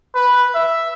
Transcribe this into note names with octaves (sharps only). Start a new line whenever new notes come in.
B4
E5